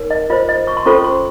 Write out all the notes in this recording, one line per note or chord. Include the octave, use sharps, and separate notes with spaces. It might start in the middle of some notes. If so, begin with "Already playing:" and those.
Already playing: D#4 A#4 C#5
D#5
F4 C5 D#5
D#5
C#6
C6
C#4 F4 A4 C5 C#6
C6